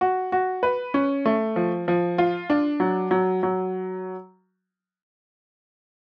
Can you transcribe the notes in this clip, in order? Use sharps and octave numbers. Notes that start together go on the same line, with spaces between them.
F#4
F#4
B4
C#4
A3
F3
F3
F4
D4
F#3
F#3
F#3